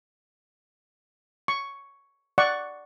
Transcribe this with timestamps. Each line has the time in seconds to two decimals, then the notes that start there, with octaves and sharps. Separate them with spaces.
1.48 C#6
2.38 D5 F#5 C#6